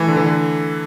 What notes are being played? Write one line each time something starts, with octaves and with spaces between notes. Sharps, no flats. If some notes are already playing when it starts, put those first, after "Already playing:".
Already playing: E3 A3
D3
E3
D3